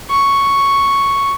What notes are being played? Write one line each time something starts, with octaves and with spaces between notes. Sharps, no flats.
C#6